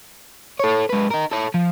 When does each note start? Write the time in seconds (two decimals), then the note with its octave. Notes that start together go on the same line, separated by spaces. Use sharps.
0.60 A4 C#5
0.90 G#2 B4
1.11 D#4 A#4
1.32 A4 C#5
1.54 F3